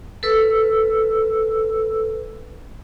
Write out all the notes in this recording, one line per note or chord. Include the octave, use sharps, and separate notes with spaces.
A4 B4 E6